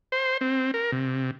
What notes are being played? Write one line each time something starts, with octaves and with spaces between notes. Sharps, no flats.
C5
C4
A#4
C3